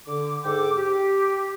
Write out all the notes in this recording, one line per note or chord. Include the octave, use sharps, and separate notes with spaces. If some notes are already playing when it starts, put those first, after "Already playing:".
D3 D6
G#2 A4 G5 D6
G4